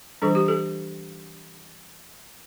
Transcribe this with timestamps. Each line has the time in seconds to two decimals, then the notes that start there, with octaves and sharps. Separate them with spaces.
0.22 E3 G3 D4 A4
0.35 G4
0.48 A4